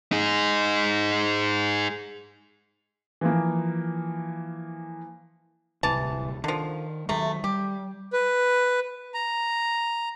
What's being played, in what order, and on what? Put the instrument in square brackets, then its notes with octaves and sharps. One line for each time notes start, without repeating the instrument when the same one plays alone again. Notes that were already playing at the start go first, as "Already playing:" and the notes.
[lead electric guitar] D#4 G#4
[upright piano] E3 F3 A#3
[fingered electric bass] D1 C2 C3 [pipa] E3 A5
[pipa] D3 F3 [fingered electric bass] D#3
[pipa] C3 A3 [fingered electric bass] D#3 F#3 G#3
[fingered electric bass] G3 [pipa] G4
[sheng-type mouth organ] B4
A#5